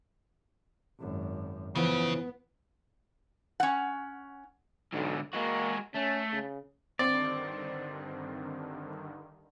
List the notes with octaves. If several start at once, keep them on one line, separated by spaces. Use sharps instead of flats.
G#1 F#2
C#3 E3 F3 B3 C#4
C#4 F#5
B1 G#2 D3
G#3 A#3 F#4
A3 C#4
C#3
G2 D3 D#3 C4 D5